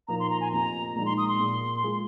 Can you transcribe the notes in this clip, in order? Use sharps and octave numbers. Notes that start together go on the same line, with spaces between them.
A#2 F3 A#3 D#4 A#4 A#5
C6
A#5
G#5
F1 F2 F3 A#3 A#5
A#1 A#2 G#3 D#4 A#5
C6
D#6
C6
A#2 A#3 G#4
G#3 F4 G#4